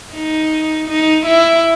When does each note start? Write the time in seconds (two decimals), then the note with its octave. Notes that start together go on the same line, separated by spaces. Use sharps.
0.13 D#4
0.88 D#4
1.26 E4